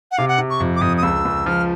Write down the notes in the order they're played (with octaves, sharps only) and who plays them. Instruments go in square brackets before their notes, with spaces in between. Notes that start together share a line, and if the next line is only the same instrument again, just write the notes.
[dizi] F#5
[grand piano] C3 [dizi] F5
[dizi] F#5
[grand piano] C3
[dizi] C#6
[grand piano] F2
[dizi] D6
[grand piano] F2 [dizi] D#6
[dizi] D#6
[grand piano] C#2 [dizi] E6
[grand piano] C#2
[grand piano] F3 [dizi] F6